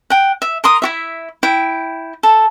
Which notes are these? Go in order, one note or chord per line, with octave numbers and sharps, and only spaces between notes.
F#5 G5
E5
A#4 C6 D#6
E4 F#4 E5
E4 G5
A4